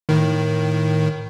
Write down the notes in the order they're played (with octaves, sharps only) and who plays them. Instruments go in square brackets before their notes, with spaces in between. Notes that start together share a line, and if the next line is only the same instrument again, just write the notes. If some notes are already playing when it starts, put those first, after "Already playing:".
[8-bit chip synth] A2 D#3